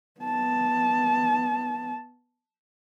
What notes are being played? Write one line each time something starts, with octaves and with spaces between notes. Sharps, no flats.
B3 A5